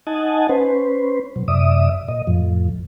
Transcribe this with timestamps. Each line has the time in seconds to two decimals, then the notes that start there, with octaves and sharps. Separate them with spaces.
0.07 D#4 D#5 F#5 G#5 A5
0.49 C#4 B4 C5
1.36 B2 F#3
1.48 F#2 C3 D5 E5 D#6
2.08 A#2 D#5
2.27 F2 A2 F3